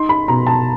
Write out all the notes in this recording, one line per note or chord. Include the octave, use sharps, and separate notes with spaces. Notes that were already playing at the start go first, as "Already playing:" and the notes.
Already playing: D#4 C6
B5
B2 A#5
A5